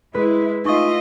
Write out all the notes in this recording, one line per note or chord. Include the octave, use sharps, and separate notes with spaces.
G#3 E4 B4
A3 D#4 F4 D#5 E5 C#6